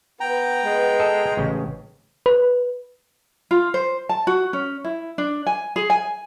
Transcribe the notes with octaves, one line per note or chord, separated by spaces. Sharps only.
B3 B4 G5 A#5
G#3
A4 D#5
A1 C#3
B4
F4
C5
A5
F#4
C#4
E4
D4
G#5
G#4
G#5